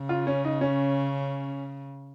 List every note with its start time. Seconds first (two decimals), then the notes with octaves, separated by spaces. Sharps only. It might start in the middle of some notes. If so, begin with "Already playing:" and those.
Already playing: C#3
0.09 F4
0.27 C#4
0.45 D#4
0.61 C#4